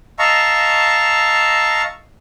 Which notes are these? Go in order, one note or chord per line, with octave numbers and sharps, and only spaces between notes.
D#5 F5 A5 A#5 C#6 E6